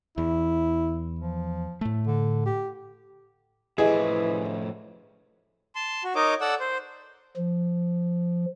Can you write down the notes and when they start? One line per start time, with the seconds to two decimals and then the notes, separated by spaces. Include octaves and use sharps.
0.18 E2 E4
1.20 F3
1.81 A2 A3
2.07 D3
2.46 G4
3.78 A2 E3 F3 E4 G#4 D#5
5.75 A5 C6
6.04 F#4
6.15 D#4 A#4 C#5 D#5 D6
6.41 A4 D5 F#5 E6
6.60 C5
7.37 F3